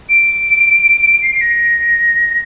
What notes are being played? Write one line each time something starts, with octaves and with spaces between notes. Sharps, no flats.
D7
C7
C7
A#6